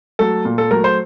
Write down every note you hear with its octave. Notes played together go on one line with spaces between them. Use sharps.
F#3 A3 A4
A#2
A4
F#3 A3 A#4
C5